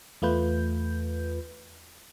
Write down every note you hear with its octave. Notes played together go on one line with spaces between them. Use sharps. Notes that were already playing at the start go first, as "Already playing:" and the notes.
E2 A3 F4 B4 G6